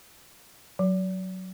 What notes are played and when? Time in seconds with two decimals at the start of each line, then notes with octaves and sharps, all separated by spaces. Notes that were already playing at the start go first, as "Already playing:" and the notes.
0.79 F#3